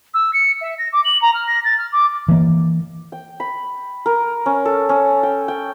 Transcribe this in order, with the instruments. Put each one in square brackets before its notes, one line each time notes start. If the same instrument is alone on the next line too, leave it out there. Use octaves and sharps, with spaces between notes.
[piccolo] E6
C#7
E5
A#6
D6
F#7
A#5
F6
A#6
A6
F6
D6
[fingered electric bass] E3 A#3
[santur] G5
B5
A#4
C#4
A4
C#4
G5
G5